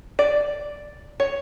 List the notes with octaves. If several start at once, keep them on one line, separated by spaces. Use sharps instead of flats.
D5
C#5